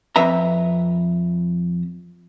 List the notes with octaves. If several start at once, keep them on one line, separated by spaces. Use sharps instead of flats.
F2 B4 E5 A#5